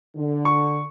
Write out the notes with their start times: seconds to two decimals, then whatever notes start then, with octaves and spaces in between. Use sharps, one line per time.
0.15 D3
0.45 C#6